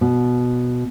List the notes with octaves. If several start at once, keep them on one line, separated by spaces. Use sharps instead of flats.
B2